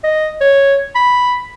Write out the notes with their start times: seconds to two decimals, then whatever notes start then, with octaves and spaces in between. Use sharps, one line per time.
0.04 D#5
0.41 C#5
0.95 B5